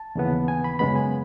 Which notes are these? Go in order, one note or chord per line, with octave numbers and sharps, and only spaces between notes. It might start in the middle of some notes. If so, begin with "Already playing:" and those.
Already playing: A5
D#2 C#3 E3 B3
G#5
B5
F#2 C#3 G#3 B3 B5
G#5